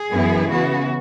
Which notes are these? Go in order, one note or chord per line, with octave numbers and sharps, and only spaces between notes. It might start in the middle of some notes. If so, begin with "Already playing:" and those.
Already playing: G#4
F#2 E3 B3 E4
C#3 E3 B3 F#4